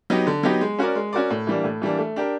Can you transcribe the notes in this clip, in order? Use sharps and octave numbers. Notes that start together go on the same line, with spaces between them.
F#3 B3 D#4 G4
D3
F#3 B3 D#4 G4
G#3
C#4 F#4 A#4 D5
G#3
C#4 F#4 A#4 D5
A2
E3 G3 A#3 D4
A2
E3 G3 A#3 D4
A3
D4 G4 A#4